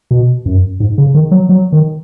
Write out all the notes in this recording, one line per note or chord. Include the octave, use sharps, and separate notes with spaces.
B2
F#2
G#2
C#3
D#3
F#3
F#3
D#3